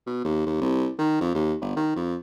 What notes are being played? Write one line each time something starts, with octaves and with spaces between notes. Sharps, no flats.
B2
D#2
D#2
C2
D#3
F2
D#2
G1
D#3
F2